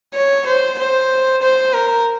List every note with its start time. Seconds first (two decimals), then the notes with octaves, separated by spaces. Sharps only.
0.14 C#5
0.46 C5
0.78 C5
1.42 C5
1.73 A#4